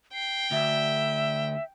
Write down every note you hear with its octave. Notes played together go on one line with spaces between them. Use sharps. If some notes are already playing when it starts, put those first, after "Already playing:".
G5 C7
D2 E5